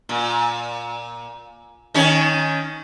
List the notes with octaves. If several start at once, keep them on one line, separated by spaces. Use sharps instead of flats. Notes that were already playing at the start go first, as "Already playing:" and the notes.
A#2
D#3 C#4 C#5